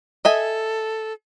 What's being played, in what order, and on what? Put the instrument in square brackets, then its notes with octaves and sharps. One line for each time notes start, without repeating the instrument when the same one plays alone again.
[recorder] A4 [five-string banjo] D#5 E5 G#5